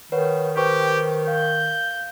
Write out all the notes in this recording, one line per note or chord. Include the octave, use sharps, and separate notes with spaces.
D#3 B4 C#5 F#5
G4 B4 C5 C#6
F5 G6